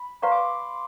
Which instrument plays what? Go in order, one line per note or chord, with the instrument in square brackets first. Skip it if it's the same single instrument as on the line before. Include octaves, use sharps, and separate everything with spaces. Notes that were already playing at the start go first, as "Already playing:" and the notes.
Already playing: [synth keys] B5
[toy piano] B4 D5 F5 A#5 C#6 [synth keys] C6
[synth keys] D6